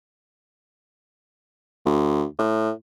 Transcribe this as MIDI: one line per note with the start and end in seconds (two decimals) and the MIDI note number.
1.86 2.25 38
2.39 2.71 45